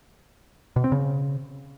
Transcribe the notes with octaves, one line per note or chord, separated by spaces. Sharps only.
B2
C4
C#3